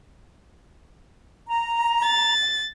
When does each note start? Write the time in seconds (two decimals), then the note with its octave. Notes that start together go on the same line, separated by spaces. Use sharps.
1.49 A#5
2.04 A6